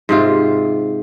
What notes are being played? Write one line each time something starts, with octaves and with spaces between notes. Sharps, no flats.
G#2 C3 F4